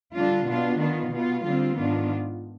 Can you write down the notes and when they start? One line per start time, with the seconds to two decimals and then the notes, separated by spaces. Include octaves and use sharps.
0.16 D3 G3 D4 F4
0.48 B2 B3 D4 F4
0.80 D#3 B3 F4
1.12 B2 B3 F4
1.44 D3 G3 C4 F4
1.76 G#2 D#3 B3 D4 F4